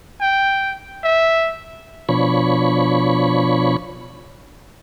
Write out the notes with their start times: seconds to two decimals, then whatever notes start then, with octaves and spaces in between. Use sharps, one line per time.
0.21 G5
1.03 E5
2.09 B2 F3 D4 C#5 B5 C#6